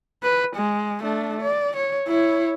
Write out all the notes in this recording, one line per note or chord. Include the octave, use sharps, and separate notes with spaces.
B4
G#3
A3 D4
D5
C#5
E4 C#5